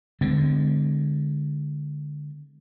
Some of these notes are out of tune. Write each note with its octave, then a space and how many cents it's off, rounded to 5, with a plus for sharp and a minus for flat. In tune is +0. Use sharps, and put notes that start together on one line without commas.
D3 +5 G#3 +0 C4 -45